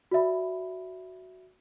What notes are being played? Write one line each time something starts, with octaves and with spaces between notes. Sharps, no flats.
F#4 D5 E5 B5